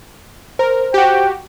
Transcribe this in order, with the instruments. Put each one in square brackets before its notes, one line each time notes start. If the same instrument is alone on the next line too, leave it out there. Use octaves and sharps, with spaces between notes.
[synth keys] A#4 [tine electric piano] C5
[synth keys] F#4 G4 [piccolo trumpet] G5